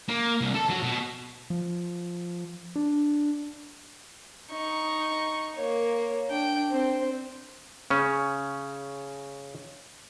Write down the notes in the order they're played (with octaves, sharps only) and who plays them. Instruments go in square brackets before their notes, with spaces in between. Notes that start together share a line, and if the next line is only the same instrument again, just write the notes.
[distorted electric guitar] A#3
C2
A4
F#3
B2
[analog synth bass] F3
D4
[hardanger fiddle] D#4 C#6
A#3 C#5
D4 G5
C4
[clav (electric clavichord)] C#3 C#4